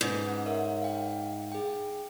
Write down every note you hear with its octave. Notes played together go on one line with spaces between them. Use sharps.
G#2 C#4 B4
F#5
A#4 C#5 E5
F5 G5
G#4 G5